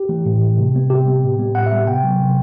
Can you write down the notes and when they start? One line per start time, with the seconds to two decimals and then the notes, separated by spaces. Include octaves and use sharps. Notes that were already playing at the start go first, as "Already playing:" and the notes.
Already playing: G4
0.09 E3 A3
0.26 A2
0.42 E3 A3
0.58 C3
0.74 G3 B3
0.90 C3 G4
1.06 G3 B3
1.23 A2
1.38 G3 B3
1.55 A2 F#5
1.66 E5
1.71 G3 B3
1.87 C3 G5
2.04 F#3 B3
2.20 C3